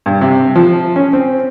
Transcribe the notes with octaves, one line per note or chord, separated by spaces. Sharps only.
G2
C3
F3
C#4
C4